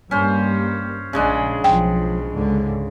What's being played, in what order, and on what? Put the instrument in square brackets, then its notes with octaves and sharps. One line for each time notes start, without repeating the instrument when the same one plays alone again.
[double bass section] G2 G3 A#3 [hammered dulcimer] C#4 C5
[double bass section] A#1 [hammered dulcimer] C#3 G#3 D4
[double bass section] B1 F3 [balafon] G5
[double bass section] C#2 G#2 D3